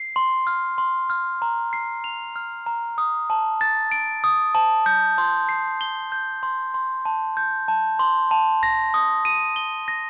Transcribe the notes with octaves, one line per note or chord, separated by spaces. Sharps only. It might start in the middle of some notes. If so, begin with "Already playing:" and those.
Already playing: C7
C6
F6
C6
F6
A#5
C7
F7
F6
A#5
D#6
A5
A6
D7
D#6
A5
G6
C6
C7
G7
G6
C6
C6
A5
G6
A5
C6
A5
A#6
D#6
D#7
G7
A#6